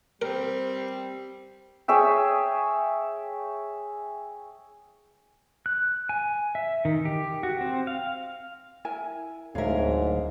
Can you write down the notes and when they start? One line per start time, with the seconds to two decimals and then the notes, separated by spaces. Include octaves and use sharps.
0.22 G3 C4 A#4
1.88 G#4 C#5 E5 G5
5.66 F#6
6.09 G#5
6.55 E5
6.85 D#3
7.05 G4
7.43 F#4
7.61 C4
7.87 F5
8.85 E4 A#4 G#5
9.55 D1 G#2 A#4 C#5 E5 F5